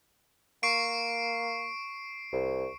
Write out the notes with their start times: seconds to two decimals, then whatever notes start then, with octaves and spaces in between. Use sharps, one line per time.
0.63 A#3 C#6 C7 D7
2.32 C2